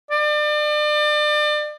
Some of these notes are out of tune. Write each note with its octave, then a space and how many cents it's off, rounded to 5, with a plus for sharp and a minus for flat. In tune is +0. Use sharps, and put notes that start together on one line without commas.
D5 +35